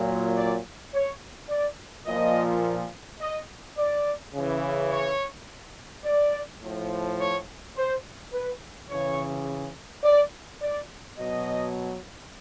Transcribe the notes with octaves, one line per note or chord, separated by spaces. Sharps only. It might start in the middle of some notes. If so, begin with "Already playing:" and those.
Already playing: A#2 F#3
D5
C#5
D5
A#2 F3 D#5
D#5
D5
C#3 E3
C#5
D5
A2 F3
C#5
C5
B4
C#3 E3 C#5
D5
D5
B2 F#3 D#5